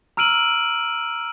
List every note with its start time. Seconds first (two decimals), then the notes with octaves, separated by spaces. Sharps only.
0.17 A#5 E6 F6 D7 D#7 F#7